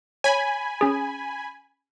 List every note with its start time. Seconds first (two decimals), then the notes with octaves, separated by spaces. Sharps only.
0.24 C#5 G#5 B5
0.81 C#4 G#4